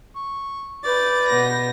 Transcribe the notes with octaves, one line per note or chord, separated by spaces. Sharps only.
C#6
B4 D5 G6 A6
B2 B3 A#6